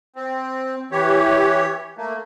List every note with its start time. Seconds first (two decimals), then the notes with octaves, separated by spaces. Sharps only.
0.16 C4
0.92 E3 G4 C#5
1.98 A3 A#3